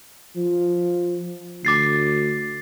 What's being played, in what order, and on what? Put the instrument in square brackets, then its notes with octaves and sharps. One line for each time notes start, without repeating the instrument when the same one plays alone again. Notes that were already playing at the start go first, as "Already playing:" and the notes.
[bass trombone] F3
[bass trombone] D2 [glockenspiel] D6 A6 C7